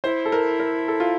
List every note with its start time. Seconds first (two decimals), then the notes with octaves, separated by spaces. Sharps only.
0.04 E4 C5
0.26 A4
0.32 A#4
0.60 A#4
0.88 A4
1.00 F4